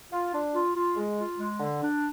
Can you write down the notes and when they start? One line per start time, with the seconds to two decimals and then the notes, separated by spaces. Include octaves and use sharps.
0.11 F4
0.34 D4
0.53 F4
0.75 F4
0.96 G#3
1.17 F4
1.38 G#3
1.59 D3
1.81 D4